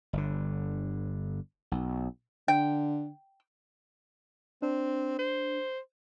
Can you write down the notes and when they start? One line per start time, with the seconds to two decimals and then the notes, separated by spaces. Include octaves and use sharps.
0.13 G1 D3
1.71 B1
2.48 D3 G5
4.62 C4 D4
5.19 C5